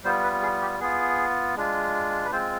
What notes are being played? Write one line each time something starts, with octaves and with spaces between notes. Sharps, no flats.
G3 B3 F4 C5
B4
G#4
G4
B3 F4 G#4
G#3 D4 F4
B4
G#3 C4 F4 C5